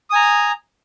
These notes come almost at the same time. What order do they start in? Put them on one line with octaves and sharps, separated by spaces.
D#6 G#5 A#5